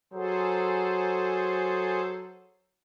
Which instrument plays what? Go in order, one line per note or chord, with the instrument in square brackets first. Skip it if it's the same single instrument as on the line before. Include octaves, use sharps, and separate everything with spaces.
[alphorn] F#3 [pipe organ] G#4 A4 C5